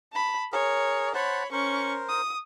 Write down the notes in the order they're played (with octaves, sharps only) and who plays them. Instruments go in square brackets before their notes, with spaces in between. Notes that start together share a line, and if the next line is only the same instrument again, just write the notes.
[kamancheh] A5 B5
[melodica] G#4 A#4 [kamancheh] C#5
[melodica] C5 F#5 A5 [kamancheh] C#5 B5
[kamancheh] C#4 C#6 [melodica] A#4 C5
[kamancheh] D#6